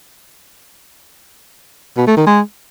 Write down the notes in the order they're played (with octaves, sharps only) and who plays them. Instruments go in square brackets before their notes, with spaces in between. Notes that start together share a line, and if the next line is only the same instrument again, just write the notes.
[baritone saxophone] B2
A3
D#3
G#3